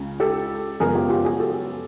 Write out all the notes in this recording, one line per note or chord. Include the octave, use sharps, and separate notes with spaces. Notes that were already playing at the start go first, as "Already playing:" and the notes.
Already playing: C#2 C#3
G4 A4
F#2 C#3 F3 G#3 B3 G#4 A#4
F4 G4
F4 G4
F#4 G#4
G4 A4